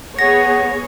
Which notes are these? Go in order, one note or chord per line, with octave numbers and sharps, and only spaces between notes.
B3 G#4 C#5 F#5 A#6